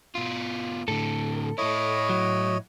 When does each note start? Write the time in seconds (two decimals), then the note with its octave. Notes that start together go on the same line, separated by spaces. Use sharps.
0.15 B2 F4
0.88 A2 D3 A4
1.58 A2 E4 C#5 D#5
2.09 F#3